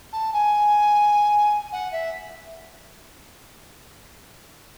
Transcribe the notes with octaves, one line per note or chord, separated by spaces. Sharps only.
A5
G#5
F#5
E5